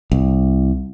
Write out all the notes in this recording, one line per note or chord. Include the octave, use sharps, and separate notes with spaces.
C2